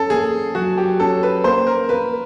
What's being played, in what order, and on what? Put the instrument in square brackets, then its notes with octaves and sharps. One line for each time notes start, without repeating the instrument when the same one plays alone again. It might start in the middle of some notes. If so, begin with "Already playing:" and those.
Already playing: [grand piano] C#4 [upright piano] A4
[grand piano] A#3 [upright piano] G#4
[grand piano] F#3 [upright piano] F#4
[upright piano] G4
[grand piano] C#4 [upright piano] A4
[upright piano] B4
[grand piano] A#3 [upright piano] C5
[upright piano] A#4
[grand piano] A#3 [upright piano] B4